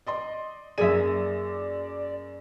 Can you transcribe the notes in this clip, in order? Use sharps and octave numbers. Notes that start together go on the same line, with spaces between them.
D5 D#5 C6
F#2 A#3 G#4 D5 E5 D#7